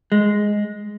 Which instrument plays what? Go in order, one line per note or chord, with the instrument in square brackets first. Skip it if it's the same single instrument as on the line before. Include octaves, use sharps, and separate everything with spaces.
[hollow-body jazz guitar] G#3